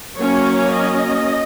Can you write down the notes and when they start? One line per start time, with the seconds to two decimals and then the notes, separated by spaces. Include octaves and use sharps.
0.17 F#3 A#3 C#4 C#5
0.72 D#5